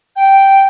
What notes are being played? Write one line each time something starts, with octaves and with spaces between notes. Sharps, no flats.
G5